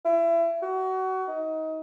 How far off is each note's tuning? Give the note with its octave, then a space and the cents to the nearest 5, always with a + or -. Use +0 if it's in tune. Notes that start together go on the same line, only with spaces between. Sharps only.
E4 +30
F#4 +25
D#4 +25